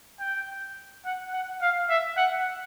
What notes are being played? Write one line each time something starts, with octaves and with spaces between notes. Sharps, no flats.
G5
F#5
F#5
F5
E5
F#5